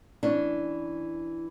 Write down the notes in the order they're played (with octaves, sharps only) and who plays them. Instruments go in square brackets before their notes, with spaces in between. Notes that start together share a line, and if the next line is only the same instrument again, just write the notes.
[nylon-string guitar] E3 C#4 D4